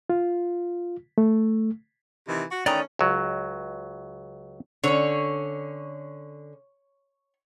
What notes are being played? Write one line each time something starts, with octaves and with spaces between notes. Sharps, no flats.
F4
A3
C3 D#3 E3
F#4
D#3 E3 A3 C#4 D5 G5 A#5 D#6
C#2 F#3
D3 C#4 C#5